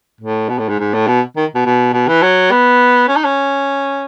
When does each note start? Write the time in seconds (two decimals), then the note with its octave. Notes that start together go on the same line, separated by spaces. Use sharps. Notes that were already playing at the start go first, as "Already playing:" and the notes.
0.21 A2
0.49 B2
0.59 A2
0.69 G#2
0.79 G#2
0.94 A2
1.08 B2
1.36 D#3
1.55 B2
1.66 B2
1.93 B2
2.08 E3
2.23 F#3
2.51 B3
3.08 C#4
3.16 D#4
3.24 C#4